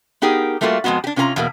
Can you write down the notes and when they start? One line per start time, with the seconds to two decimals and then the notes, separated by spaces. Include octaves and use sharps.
0.22 B3 D#4 G4 G#4 A#4
0.61 G3 A3 A#3 F4 F#4
0.84 F2 B2 G#3 B3 F#4
1.04 D4 G4
1.16 C3 C#4 F4 B4 A#5
1.36 E2 B2 A#3